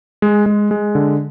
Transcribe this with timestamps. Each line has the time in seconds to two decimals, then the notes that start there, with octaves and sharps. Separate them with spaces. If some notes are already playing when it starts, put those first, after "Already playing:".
0.22 G#3
0.46 G#3
0.71 G#3
0.95 D3